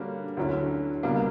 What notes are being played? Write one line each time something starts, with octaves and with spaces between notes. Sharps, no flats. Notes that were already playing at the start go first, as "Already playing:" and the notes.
Already playing: D3 G3 A#3 C#4 F#4
D2 D3 F#3 C#4 E4
C#2 B2 G3 A#3